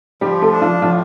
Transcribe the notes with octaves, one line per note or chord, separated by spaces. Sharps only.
F3 G3 G4
A3 A4
D4
F3 F4
A2 F3 F4